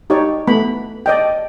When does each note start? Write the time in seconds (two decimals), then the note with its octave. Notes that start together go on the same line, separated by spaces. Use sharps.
0.10 D#4 G4 C#5 D5
0.47 A3 B3 B5
1.06 D5 D#5 G5